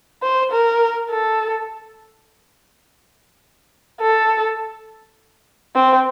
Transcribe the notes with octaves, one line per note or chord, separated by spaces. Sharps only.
C5
A#4
A4
A4
C4